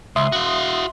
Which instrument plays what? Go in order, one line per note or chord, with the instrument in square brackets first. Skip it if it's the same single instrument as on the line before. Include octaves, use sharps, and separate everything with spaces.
[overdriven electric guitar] C#2 [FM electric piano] E5 C6 D#6
[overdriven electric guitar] F#4 F5